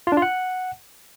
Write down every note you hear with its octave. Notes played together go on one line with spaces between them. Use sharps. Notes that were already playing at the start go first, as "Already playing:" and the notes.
F4
D4
F4
F#5